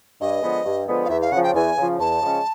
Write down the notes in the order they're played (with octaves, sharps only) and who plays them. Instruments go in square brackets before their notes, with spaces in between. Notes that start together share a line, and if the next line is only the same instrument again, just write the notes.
[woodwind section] G2 [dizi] D#5
[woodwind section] D3 F3 G#3 B3
G2
D3 F3 G#3 B3
[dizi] F5
[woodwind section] E2 [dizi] E5
[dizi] F5
[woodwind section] C#3 [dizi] F#5
[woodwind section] F3
[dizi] G5
[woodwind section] E2 [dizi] G#5
[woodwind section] C#3 F3
[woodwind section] E2 [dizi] A5
[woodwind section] C#3 F3 G#3 C#4